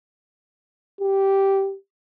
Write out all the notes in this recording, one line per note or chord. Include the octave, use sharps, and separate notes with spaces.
G4